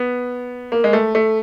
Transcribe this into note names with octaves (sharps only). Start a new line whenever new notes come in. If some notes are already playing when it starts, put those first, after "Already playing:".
Already playing: B3
A#3
G#3
A3
A3